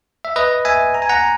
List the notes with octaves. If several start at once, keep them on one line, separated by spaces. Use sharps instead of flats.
E5
B4 D#5
E5 G#5
A#5
G#5
F#5 A#5